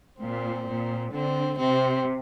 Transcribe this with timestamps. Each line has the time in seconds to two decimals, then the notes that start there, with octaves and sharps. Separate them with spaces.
0.20 A#2 C4
0.67 A#2
1.12 D3 C4
1.58 C3 C4